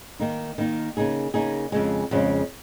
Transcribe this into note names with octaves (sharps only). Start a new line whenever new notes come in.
D#3 A#3 D#4
D#3 A#3 D#4
C#3 A#3 D#4 G#4
C#3 A#3 D#4 G#4
F2 C#3 G#3
F2 C#3 G#3